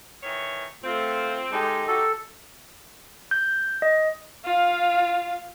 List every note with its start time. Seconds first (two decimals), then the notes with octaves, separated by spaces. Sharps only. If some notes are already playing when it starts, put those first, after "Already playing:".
0.23 D#3 E3 C#5
0.83 A3 C4 F4
1.52 G#3 D#4 G4 A4
1.88 F#4 G4 A4
3.31 G6
3.82 D#5
4.45 F4 F5